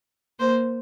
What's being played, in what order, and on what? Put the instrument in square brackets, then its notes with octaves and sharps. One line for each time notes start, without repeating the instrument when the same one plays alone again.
[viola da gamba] A#3 [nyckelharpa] C5